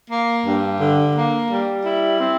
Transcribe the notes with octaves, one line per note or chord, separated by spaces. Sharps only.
A#3
G2
D3
A#3
G3
E4
C4